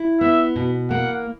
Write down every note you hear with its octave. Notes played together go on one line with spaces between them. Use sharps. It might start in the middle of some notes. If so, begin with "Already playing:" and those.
Already playing: E4
B3 E5
B2
A#3 F#5